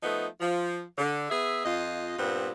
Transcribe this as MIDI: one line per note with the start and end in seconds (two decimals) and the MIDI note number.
0.03 0.27 53
0.03 0.27 57
0.03 0.27 59
0.03 0.27 63
0.40 0.81 53
0.98 1.29 50
1.30 1.62 59
1.30 1.62 68
1.30 1.62 76
1.65 2.17 41
1.65 2.17 65
1.65 2.17 75
2.18 2.52 43
2.18 2.52 46
2.18 2.52 59
2.18 2.52 60